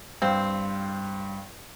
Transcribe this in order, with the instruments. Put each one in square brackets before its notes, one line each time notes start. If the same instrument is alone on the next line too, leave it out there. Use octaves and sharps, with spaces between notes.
[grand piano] G2 [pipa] C4 [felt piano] C5 F5 G5